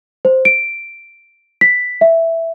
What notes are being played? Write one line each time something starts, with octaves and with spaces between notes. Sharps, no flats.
C5
D7
B6
E5